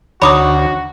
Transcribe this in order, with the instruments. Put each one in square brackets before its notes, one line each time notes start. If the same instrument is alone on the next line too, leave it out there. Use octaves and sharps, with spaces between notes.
[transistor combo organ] D2 [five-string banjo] D#4 C#5 A#5 [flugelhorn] F#4 [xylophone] B5 D6 D#6